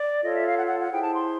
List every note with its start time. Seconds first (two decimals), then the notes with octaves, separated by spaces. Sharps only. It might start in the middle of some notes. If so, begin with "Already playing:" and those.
Already playing: D5
0.23 F4 A4 C#5 D#5
0.35 E5
0.47 F5
0.58 F#5
0.69 F#5
0.80 F#5
0.91 E4 G#4 C5 G5
1.03 A5
1.15 C6